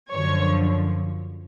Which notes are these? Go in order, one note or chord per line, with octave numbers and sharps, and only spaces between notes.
F#2 D3 F3 C#5